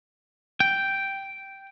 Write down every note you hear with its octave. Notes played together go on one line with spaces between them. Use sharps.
G5